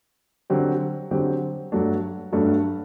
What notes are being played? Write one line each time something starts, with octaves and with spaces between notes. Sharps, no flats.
D3 F#3 C4 G4
D3 F#3 C4 G4
G2 F#3 A3 D4
G2 F#3 A3 D4